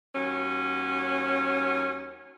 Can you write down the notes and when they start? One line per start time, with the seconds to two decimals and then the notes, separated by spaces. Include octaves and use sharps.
0.15 D#2 F#3 C#4